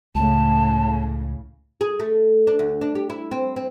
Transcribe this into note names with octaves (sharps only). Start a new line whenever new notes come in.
C#2 A2 C#3 A5
G#4
A3
D4
D2
D4
G4
E4
C4
C4